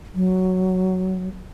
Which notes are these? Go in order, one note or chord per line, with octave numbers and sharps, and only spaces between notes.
F#3